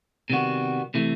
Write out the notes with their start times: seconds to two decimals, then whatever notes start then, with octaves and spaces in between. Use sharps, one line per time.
0.30 C3 D#3 G3 B3 F#4
0.94 C3 E3 A3